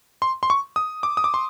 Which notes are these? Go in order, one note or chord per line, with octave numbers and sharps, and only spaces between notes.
C6
C6
C#6
D#6
D6
D#6
D6
C6